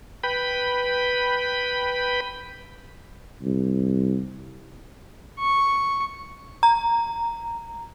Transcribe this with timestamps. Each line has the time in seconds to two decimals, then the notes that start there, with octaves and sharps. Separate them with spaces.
0.24 B4 G5 B5
3.42 C2
5.39 C#6
6.63 A#5